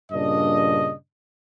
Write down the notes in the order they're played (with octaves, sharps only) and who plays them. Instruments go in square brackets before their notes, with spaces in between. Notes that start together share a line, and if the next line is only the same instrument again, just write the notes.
[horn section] G2 A#2 C#3 D4 D#5